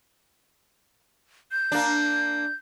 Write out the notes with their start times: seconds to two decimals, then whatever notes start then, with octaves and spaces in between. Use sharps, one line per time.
1.52 G6
1.72 A#3 D4